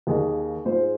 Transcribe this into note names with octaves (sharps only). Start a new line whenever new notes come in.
D#2 D#3 A#3 G#4 D#5
G#2 G#3 F4 G#4 C5